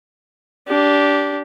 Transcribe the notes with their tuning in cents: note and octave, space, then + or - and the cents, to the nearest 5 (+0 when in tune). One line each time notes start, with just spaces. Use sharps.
D4 -20 G4 -10